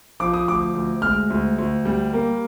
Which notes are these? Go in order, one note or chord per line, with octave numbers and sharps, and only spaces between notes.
F3 D6
D#6
D2 D6
D2
G#3 F6
D2
D2
G3
A#3